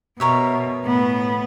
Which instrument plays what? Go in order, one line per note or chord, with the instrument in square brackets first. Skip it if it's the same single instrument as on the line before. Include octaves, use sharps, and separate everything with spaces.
[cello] B2 [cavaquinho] A#4 C#5 E5
[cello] A2 B3